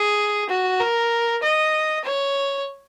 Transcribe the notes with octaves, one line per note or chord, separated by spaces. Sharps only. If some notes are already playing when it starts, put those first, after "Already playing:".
Already playing: G#4
F#4
A#4
D#5
C#5